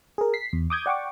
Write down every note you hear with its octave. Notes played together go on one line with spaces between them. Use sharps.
G#4 A#4
B6 C7
E2
D6 D#6 G6 G#6
D5 F#5 G5 C#6 D6